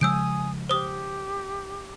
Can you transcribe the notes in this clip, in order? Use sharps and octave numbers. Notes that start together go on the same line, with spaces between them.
C#3 F3 G#3 G#5 D#6 E6 G6 D7
G4 C5 D#6